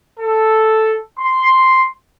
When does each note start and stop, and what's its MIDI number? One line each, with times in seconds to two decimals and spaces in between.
0.20 0.98 69
1.20 1.87 84